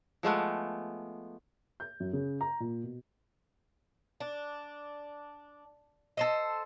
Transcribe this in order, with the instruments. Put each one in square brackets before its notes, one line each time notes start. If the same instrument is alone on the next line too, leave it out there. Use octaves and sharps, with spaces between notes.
[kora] F3 G#3 A3 B3
[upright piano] G6
F#2
C#3
A#5
A#2
B2
[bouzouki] D4
A4 C5 D#5